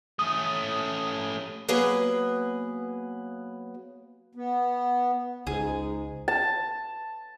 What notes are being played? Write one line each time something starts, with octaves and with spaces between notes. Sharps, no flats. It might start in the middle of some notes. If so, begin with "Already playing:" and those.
A3 C#4 D#6
F#3 A#3 B3 G#4 B4
B3
C#2 G#2 G#4
A5